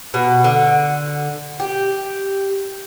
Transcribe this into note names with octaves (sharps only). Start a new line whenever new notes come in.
B2
D3
G4